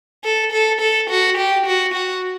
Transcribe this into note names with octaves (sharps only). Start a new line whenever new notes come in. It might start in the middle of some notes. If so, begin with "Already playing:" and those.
A4
A4
A4
F#4
G4
F#4
F#4